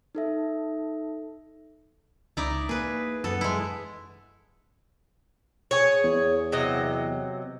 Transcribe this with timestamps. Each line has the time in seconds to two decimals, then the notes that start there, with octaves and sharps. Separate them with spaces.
0.15 D#4 A4 E5
2.37 C#2 D#4 E4 D5
2.69 A#3 G#4 B4
3.24 F#2 B3 A4
3.41 G#3 E4
5.71 G#4 C#5
6.04 E2
6.52 C3 F#3 D#5